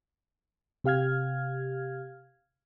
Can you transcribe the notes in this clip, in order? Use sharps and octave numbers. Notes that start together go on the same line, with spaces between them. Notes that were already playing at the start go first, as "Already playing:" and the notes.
C3 G4 F5 F6 G#6